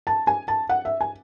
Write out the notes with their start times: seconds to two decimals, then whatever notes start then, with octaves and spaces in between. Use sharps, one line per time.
0.07 A5
0.27 G#5
0.48 A5
0.69 F#5
0.85 E5
1.01 G#5